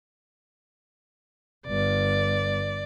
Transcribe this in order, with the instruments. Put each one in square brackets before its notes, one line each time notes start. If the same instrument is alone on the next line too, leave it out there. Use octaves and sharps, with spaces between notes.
[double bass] G1 [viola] D5